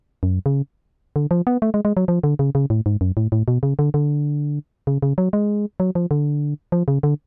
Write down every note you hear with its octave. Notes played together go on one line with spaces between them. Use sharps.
F#2
C#3
D3
F3
B3
A3
G#3
G#3
F#3
F3
D3
C#3
C#3
A2
G#2
F#2
A2
A2
B2
C#3
D3
D3
C#3
C#3
F#3
G#3
F#3
F3
D3
F3
C#3
D3